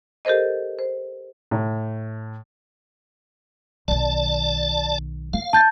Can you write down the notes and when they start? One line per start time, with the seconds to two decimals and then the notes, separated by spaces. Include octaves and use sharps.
0.25 G4 A4 A#4 C5 D#5
0.79 C5
1.51 A2
3.88 B1 D#3 D5 A5
5.33 A#3 F5
5.53 A5 G6 A6